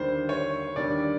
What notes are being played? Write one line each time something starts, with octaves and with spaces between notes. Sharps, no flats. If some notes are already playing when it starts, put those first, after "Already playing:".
Already playing: D#2 D3 G3 C5
C#5
D#2 D3 G3 D5